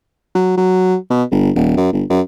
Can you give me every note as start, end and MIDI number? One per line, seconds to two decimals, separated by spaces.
0.35 0.54 54
0.57 0.95 54
1.10 1.23 47
1.31 1.50 31
1.55 1.76 27
1.77 1.93 42
1.93 2.04 31
2.09 2.21 42